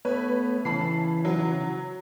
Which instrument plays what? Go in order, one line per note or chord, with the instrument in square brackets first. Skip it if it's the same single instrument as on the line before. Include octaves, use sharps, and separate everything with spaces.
[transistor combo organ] A3 B3 [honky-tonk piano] B4 C#5
[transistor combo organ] C#3 E3 [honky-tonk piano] A5 B5 C7
[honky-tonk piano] F#3